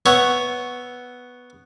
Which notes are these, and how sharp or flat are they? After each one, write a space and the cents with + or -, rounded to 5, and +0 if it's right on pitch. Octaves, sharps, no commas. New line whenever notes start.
B3 +0 C#5 +0 E5 +0